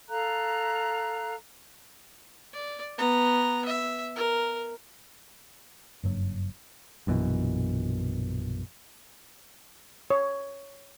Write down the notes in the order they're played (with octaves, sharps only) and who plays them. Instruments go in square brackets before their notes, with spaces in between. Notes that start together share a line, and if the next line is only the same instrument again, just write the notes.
[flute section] A4 F5 A#5 F#6
[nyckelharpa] D5
B3 A#5
E5
A#4
[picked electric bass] F#1 G2 F#3
A#1 F#2 B2 E3
[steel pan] C#5